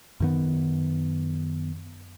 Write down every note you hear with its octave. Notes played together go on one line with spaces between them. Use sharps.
F#2 D#3 B3